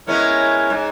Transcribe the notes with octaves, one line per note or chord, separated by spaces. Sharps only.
G#3 B3 C#4 E4 A#4 C#5
G#2